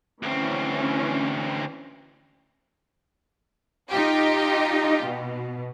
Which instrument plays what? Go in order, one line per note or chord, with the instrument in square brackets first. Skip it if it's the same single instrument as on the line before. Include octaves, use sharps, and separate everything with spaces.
[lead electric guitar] D2 C4 [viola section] E3 C#4
[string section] D#4 F4 G4
B2